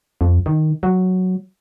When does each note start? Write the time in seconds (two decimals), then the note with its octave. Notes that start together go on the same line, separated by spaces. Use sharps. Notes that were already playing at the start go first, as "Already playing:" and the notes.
0.21 F2
0.46 D#3
0.83 F#3